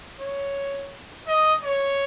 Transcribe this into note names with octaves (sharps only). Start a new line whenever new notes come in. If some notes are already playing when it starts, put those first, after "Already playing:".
C#5
D#5
C#5